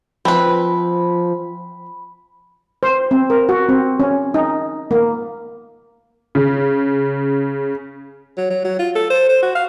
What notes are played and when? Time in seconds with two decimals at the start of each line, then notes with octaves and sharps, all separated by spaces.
0.25 F3 C4 B4 B5
2.83 C5
3.11 C4
3.30 A#4
3.49 F#4
3.69 C4
4.00 C#4
4.34 D#4
4.91 A#3
6.35 C#3
8.37 F#3
8.50 F#3
8.64 F#3
8.79 F4
8.95 A4
9.10 C5
9.29 C5
9.43 F#4
9.55 F5